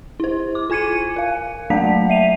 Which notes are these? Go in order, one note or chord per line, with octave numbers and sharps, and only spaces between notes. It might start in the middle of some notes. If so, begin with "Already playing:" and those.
E4 C5
D6
F4 G#5 G#6 C#7 D#7
A#4 F5
F#3 A3 A#3 D4 A5 B6
E5 D#7 F7